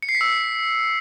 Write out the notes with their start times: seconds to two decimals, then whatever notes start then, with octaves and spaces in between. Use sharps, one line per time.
0.03 C#7
0.09 C7
0.15 B6
0.21 E6